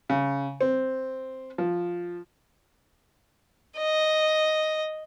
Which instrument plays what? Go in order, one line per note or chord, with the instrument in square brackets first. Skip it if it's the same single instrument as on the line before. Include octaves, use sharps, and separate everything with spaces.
[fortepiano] C#3
C4
F3
[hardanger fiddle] D#5